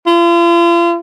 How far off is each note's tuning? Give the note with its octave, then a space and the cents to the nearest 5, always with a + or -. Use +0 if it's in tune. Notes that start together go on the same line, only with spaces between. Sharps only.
F4 -40